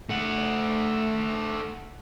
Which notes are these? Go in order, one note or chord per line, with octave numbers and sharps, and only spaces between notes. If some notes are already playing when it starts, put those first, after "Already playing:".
A3 F#5